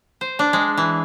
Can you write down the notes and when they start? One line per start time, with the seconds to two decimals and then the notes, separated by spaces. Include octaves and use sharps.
0.21 C5
0.39 D4
0.53 G#3
0.78 E3